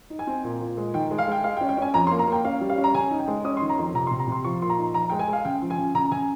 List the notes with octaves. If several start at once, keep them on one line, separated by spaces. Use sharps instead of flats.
D#4
G#5
C4
A#2
A#2
G#3
D#3 G5
G#3
F5
G#3 G5
G#3 F5
G5
C#4
G5
C#4 G#5
F2 A#5
C6
A#3
A#5
A#3 G5
C#4 F5
G3
F5
C#4
A#5
C#3 G#5
D#4
G5
G#3
C#4 D#6
C6
D#3
A#5
F2
C3 A#5
C6
C3
A#5
C3 C6
F3 C#6
A#2 C6
A#5
D#4
F3 A#5
G#3 G5
G#5
G#3 F5
C#3 G5
F3
G#5
C#3
C#3 A#5
C#3 G#5